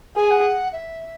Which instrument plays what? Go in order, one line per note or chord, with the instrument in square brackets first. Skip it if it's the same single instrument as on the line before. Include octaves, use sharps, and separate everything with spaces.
[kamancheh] G#4 [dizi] G#5
[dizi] F#5
E5